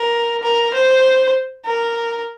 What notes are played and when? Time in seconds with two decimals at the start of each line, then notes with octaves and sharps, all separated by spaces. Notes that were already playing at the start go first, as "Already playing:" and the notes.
Already playing: A#4
0.43 A#4
0.74 C5
1.66 A#4